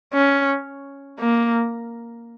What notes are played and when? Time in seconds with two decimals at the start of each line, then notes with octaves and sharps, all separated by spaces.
0.14 C#4
1.20 A#3